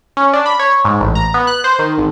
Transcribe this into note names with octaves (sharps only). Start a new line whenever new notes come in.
C#4
D4
B5
C#5
G#2
A1
A#5
B3
F#6
C5
D#3
G#1